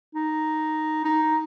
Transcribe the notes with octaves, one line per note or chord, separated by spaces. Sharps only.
D#4
D#4